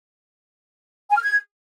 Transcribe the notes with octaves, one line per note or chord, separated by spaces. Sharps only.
G#5
F6
G#6